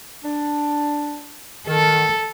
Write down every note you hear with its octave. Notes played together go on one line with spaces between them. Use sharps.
D4
D#3 A4